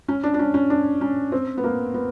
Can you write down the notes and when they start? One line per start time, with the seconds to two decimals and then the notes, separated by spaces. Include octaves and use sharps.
0.08 C#4
0.23 D4
0.34 D4
0.39 C#4
0.54 C#4
0.70 D4
1.01 C#4
1.32 C4
1.57 B3
1.64 A#3
1.94 B3